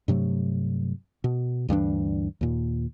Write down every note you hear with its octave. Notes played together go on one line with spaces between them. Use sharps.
G2 C3 F#3 A3
B2
D2 G2 E3 D4
D#2 A#2